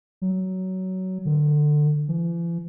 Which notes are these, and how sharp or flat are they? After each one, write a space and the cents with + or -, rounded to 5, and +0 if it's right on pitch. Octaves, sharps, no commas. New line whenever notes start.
F#3 +15
D3 +20
E3 +45